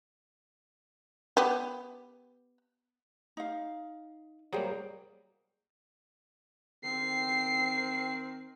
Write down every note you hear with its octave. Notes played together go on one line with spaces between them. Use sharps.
B3 G4
D#4 F5
F#3 G3 A#3 G#4 C5 G5
D#3 C4 C7